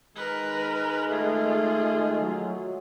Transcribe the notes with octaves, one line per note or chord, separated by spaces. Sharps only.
D#3 G#3 A#4 B4
A3 F4 G#4
F#3